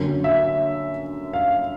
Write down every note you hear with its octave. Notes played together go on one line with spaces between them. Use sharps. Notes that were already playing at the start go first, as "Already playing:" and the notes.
Already playing: F#2 D3 F#3 A#3
E5
F5